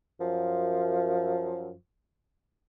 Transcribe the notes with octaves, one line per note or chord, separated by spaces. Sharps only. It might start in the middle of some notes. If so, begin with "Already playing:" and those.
F#2 F3